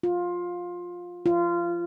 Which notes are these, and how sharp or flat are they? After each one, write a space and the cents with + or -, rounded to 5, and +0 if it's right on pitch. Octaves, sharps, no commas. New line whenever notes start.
F4 +15
F4 -20